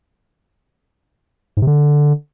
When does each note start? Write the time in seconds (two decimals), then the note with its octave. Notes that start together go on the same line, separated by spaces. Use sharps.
1.57 G#2
1.62 C3
1.67 D3